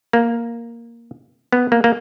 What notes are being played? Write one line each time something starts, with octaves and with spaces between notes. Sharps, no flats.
A#3
B3
A#3
A#3